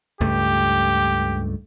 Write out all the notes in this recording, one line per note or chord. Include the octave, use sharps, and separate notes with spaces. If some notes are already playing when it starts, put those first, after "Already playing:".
C#2 G2 A3 G4